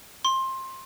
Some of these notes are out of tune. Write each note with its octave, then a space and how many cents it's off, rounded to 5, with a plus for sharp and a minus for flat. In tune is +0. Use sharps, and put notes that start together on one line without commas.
C6 +20